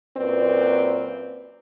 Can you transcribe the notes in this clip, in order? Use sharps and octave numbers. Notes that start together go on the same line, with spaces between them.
F#2 A#2 C4 B4 D5